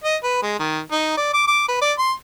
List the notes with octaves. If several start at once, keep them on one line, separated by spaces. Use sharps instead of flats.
D#5
B4
G#3
D#3
D#4
D5
D6
D6
B4
D5
C6